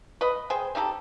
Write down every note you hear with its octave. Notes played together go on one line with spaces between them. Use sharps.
B4 D#5
G#4 C5 G5
C4 D#4 G4 A4